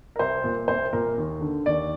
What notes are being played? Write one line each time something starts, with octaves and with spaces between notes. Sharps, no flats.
A#4
C2 C5
A#2
C2 C5
A#2 A#4
D#2
D3
D#2 D5